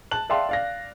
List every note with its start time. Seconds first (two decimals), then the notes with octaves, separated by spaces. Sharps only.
0.11 A5 F#6 F#7
0.30 D5 E5 F5 G5 A5 C6
0.49 D5 F5 A#6